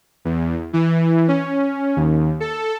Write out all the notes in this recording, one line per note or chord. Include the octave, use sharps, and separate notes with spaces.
E2
E3
C#4
D#2
A4